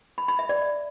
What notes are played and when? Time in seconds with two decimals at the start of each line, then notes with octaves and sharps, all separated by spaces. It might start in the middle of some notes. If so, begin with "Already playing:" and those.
0.18 B5
0.28 B5
0.39 E5
0.49 D5